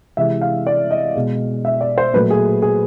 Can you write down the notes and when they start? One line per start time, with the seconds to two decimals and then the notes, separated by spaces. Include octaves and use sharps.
0.17 C3 E3 G#3 E5
0.41 F5
0.67 D5
0.91 D#5
1.15 B2 G#3
1.65 E5
1.81 D5
1.98 C5
2.13 A#2 F#3 A3 B4
2.30 G#4
2.62 G#4